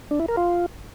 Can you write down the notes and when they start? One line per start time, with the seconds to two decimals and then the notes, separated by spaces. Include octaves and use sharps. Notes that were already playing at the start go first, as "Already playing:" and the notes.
0.11 D4
0.20 E4
0.28 A#4
0.37 F4